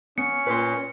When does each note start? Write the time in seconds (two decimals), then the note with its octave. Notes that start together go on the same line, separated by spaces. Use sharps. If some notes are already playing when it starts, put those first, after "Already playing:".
0.18 B3 C#4 C#7
0.47 A#2 B4 C6